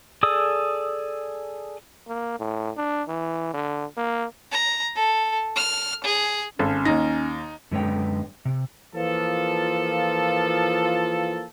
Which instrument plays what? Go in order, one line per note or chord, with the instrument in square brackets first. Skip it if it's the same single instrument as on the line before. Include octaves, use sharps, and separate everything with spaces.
[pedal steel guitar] G#4 A4 D5 D#6 E6
[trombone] A#3
A2
D4
E3
D3
A#3
[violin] A#5
A4
F6
G#4
[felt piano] G#1 A4 [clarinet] C#4
[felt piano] D#2 A#6 [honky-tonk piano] D#4
[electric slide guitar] F#2 D3 G#3 B4 C#5 G5
C3
[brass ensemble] E3 F3 A#3 F4 A4